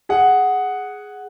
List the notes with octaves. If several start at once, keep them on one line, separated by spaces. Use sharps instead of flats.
G#4 F#5